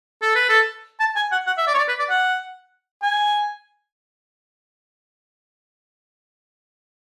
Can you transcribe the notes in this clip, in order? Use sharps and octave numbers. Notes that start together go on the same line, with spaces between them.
A4
B4
A4
A5
G#5
F#5
F#5
E5
D5
C#5
D5
B4
D5
F#5
G#5